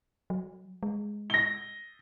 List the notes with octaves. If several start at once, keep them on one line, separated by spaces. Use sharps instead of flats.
F#3
G#3
A#6 G7